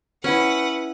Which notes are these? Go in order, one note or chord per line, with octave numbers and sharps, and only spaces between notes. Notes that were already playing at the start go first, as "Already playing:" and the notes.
C#4 E4 B4 F#5